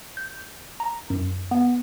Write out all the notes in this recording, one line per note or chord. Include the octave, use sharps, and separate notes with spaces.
G6
A#5
F#2
B3